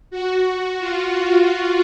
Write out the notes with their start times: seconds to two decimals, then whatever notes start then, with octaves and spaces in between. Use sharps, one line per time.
0.11 F#4
0.45 F#4
0.79 F4